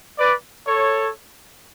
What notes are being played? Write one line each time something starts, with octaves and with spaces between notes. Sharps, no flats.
B4 D5
A4 C#5